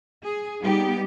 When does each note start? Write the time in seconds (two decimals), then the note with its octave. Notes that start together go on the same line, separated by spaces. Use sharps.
0.24 G#4
0.61 G3 B3 D#4 G4